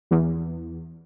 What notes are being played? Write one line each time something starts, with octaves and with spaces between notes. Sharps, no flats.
E2